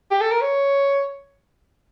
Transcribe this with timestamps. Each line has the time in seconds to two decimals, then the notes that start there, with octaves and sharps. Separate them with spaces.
0.11 G4
0.21 A4
0.31 A#4
0.41 C#5